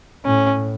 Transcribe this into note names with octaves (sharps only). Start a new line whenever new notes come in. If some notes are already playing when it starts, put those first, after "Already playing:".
A2 C#4